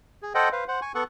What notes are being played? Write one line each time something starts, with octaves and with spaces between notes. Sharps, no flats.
G#4
A4 C5 D#5 F#5 G5
B4 C5 F5
C5 F#5
G#5 C#6
B3 A4 F#5 C#6